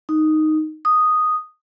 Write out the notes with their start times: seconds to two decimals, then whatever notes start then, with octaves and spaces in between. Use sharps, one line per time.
0.09 D#4
0.85 D#6